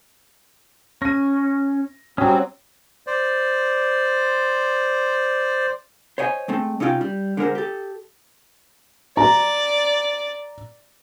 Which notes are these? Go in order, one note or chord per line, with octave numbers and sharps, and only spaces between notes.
C#4 A#6 D#7
F#3 G3 C4 C#4 C#5 D#6
C5 D5
C5 C#5 D#5 F#5 G#5
G#3 A3 C4
C3 C#4 D#4 F4 C#5 G5
G3
D3 G#3 A#4 C5
G4 A4
D5 A#5